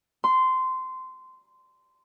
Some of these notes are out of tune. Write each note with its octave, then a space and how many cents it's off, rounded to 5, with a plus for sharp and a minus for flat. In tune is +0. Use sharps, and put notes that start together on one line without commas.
C6 -15